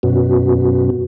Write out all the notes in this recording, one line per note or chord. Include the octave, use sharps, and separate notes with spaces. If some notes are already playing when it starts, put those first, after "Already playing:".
F#2 B2